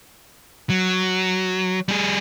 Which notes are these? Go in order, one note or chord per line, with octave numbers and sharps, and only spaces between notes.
F#3
G3 G#4